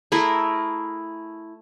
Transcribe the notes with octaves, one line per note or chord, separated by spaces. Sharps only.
A3 E4 G#4 A#4